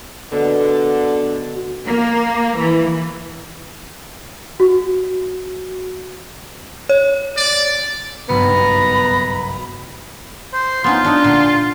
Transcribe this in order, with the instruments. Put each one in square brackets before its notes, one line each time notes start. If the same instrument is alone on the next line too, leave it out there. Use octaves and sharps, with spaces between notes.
[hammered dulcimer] B2 [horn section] D3
[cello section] A#3
E3
[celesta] F#4
[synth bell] C#5
[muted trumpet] D5
[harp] F#1 B1 G2 [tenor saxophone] B3 [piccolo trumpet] A#5 [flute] B5
[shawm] C5
[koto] B3 C#4 D#4 [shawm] F4
[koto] D4 D#4
A#2 D3